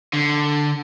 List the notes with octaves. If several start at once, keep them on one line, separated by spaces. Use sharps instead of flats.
D3